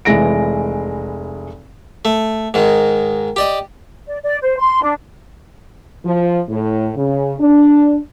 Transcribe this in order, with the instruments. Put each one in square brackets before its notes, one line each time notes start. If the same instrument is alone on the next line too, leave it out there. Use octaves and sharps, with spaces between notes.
[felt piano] F1 E3 G#3 A#6 D7
[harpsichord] A3
G#2 D#3
G4 D5 D#5
[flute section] D5
D5
C5
C6
D4
[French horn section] F3
A2
C#3
D4